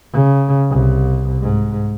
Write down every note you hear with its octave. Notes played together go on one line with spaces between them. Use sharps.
C#3
C2
G#2